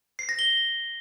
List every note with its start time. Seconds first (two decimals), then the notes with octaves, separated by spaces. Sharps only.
0.19 C7
0.29 A#6
0.39 G7